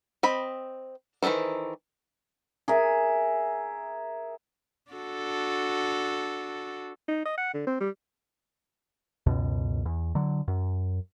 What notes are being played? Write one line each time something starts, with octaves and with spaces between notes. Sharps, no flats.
C4 D#5 B5
D#3 E3 G#3 A4 C5
G#4 A#4 E5
D4 F#4 A4
D#4
D#5
F#5
D3
C4
G3
C#2 F#2 B2
E2
D3 F#3
F#2